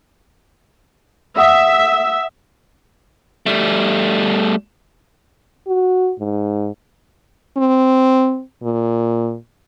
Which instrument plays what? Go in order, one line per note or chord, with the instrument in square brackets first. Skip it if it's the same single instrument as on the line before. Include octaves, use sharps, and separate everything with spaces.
[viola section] E5 [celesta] F#5 D#6 E6
[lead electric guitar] G3 A3
[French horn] F#4
G#2
C4
A#2